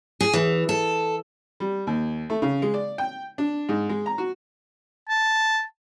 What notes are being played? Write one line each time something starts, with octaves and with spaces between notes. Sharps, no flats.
G#4
E3
A4
G3
D#2
A3
C#3
G#3
D5
G5
D4
G#2
G#3
A#5
F#4
A5